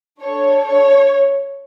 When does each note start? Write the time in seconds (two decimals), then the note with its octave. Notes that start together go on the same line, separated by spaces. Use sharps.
0.21 D4 A4 C#5
0.66 C#5